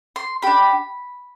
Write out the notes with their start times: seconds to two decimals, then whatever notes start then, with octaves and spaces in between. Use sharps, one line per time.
0.16 C6
0.42 D4 G4 B5